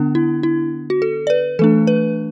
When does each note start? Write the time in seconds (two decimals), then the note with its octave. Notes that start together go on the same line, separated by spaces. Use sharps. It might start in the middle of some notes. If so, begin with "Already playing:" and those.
Already playing: D3 B3 D4
0.15 E4
0.43 E4
0.90 F#4
1.02 A4
1.27 D5
1.30 B4
1.59 E3 A3 D4 A4
1.87 B4